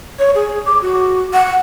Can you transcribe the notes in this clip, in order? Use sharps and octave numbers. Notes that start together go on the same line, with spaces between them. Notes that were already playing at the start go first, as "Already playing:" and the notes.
C#5
G#4
D6
F#4
F#5